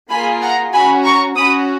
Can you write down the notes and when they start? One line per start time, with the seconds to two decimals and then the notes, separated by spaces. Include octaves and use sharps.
0.10 A#3 F4 G#4 G#5 B5
0.41 F#5 A#5
0.73 C#4 F#4 G#5 B5
1.04 A#5 C#6
1.35 C#4 F#4 B5 D#6